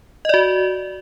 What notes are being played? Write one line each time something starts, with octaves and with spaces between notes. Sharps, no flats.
F#4 D5 D#5